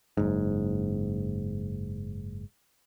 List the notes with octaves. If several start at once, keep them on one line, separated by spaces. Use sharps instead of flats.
F#1 G#2